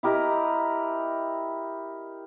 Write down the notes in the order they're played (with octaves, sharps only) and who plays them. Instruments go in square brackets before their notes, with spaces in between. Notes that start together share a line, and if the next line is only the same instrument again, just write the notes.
[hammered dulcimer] E4 G4 A#4 D#5